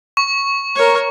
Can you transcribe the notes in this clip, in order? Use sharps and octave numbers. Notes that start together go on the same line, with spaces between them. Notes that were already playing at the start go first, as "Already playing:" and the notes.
C#6
A#4 C#5